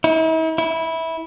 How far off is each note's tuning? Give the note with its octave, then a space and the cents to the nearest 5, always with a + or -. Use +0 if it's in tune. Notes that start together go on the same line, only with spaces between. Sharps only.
E4 -45
E4 -15